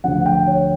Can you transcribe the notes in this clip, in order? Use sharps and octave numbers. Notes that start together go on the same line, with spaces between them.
D2 D3 F3 F#5
G5
C#5